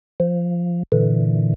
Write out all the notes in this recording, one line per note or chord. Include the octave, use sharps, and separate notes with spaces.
F3
A#2 D3 E3